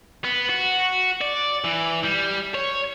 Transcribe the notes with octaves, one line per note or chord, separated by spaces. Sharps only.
B3
F#4
D5
E3
G3
C#5